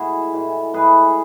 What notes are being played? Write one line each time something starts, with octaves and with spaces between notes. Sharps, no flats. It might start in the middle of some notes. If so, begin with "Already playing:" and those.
Already playing: A2 E3 G#3 E4 F#4 G#4 F#5
A2 E3 G#3
A2 E3 G#3 G#4 B4